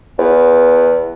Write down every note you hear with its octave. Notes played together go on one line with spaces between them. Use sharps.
E2